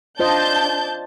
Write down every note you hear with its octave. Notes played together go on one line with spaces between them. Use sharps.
D4 F4 C5 D#5 A5 G6